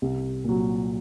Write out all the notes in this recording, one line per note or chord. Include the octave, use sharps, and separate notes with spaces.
C2
A#2 F#3